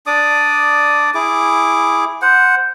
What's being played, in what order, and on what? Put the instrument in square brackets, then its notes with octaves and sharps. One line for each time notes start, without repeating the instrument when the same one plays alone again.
[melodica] D4 D5 D6 D#6
E4 G#4 D6
C5 F#5